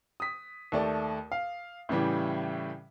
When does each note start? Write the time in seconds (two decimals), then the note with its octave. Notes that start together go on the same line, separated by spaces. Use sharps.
0.20 D#6 B6
0.72 D#2 A3 D5
1.32 F5
1.89 A2 C#3 E3 G3